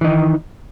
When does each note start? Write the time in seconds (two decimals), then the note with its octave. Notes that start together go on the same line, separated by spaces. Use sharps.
0.01 E3
0.04 D#4
0.07 D#3